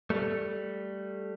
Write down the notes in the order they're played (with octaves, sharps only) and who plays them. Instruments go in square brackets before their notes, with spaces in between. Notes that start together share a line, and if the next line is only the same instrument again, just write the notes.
[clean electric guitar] G3 A3